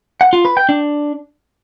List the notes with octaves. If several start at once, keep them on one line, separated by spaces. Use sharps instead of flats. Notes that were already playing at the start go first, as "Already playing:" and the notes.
F#5
F4
B4
G5
D4